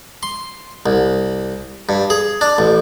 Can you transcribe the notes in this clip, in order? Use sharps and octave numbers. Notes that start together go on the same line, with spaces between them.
C6
C2
G2
G#4
D4
A1